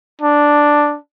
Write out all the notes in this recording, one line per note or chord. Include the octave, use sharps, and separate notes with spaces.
D4